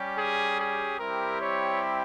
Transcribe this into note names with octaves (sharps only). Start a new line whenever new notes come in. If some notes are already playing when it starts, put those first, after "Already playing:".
Already playing: G3 C#4 G4
G#4
G#4
G3 C4 E4 G4 A#4
C#5